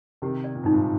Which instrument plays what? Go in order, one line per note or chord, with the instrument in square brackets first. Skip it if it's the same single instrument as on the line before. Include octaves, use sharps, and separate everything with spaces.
[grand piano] C3 D#3 [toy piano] G4
[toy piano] D5
[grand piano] A#2
[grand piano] G#2 [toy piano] D#4
[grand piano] G2 A#2